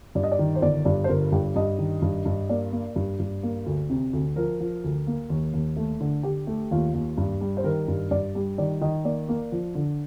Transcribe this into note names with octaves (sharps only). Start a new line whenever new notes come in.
G2 D5
D#5
D5
D#3
C5
G1 D5
G2 D5
C5
G1 A#4
G2 G4
G2 D#5
D#3
G2
G2
A#3 D5
A#3
G2
G2
A#3
D2
C3
D2
F3 A#4
F3
D2
A#3
D#2
D#2
A3
D3
D3 G4
A3
D#2 F4
D#2
G2
G3
C5
D#3 A#4
G2
G2 D5
G3
D#3 D5
D#3 D#5
A#3 D5
A#3
F3
D3